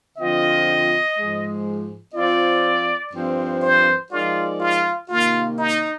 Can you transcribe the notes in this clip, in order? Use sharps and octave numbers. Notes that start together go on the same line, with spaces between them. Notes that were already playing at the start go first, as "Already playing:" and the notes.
D3 F3 C4 F4 D#5
G#2 F3 G#3
F3 C4 F4 D5
G2 F3 C4
C5
F3 G#3 D#4 F4 A#4 D5
F4
C3 D#3 A#3 F4
D#4